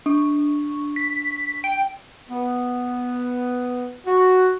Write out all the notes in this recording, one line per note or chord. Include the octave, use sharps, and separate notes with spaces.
D4 C#6
B6
G5
B3
F#4